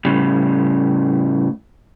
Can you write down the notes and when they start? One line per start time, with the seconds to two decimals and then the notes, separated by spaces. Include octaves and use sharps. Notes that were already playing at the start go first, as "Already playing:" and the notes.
0.05 A2 C#3 G3